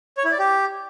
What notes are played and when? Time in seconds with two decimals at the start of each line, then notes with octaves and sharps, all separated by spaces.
0.17 C#5
0.25 E4
0.32 D5
0.39 G4